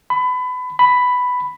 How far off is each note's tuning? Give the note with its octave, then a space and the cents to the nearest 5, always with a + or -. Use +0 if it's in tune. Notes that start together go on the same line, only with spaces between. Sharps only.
B5 +25
B5 +5